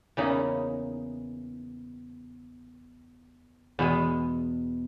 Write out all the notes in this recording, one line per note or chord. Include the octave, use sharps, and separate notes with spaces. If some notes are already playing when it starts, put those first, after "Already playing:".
E2 C#3 E3 A#3 D#4
E2 B2 G#3